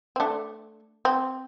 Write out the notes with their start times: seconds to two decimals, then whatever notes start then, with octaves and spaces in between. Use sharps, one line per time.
0.16 C4
0.20 A3 D4
1.05 C4